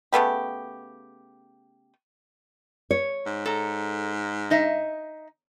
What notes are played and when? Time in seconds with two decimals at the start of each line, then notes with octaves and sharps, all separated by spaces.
0.12 C#3 A3 B3 G4
2.91 C#5
3.26 G#2
3.46 A4 A#5
4.50 D#4 D#5 E5